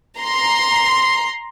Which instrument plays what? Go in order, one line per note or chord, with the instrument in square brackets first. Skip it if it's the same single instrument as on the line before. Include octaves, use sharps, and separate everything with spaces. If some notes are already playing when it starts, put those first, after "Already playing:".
[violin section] A#5 C6